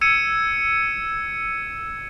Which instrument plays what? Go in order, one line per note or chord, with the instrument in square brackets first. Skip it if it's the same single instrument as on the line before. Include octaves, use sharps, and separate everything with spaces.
[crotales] E6 G#6 C#7 D#7 E7